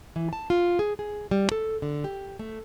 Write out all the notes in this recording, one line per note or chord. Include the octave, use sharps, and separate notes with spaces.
E3
A5
F4
G#4
G#4
G3
A4
D3
G4
A3